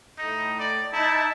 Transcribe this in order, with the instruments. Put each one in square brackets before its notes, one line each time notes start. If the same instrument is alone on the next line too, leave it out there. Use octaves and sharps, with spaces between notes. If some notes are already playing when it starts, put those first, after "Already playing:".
[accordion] A2 [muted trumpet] D#4
[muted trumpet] D5
[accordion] D#4 A5 [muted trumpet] E4